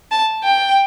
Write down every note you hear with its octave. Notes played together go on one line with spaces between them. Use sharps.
A5
G5